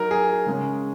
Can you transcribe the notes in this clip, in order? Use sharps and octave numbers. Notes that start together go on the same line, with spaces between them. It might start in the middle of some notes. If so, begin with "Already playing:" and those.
Already playing: F#3 D#4 A#4
G#4
C#3 G#3 C#4